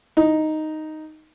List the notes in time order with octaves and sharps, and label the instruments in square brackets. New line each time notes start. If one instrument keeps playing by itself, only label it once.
[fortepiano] D#4